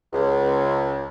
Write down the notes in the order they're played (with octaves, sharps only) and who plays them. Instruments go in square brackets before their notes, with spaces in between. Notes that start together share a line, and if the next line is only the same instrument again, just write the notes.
[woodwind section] C#2